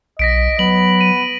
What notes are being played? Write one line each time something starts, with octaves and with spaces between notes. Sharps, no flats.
B1 D#5 A#6 B6 D7
F#3 B3 F#7
D#7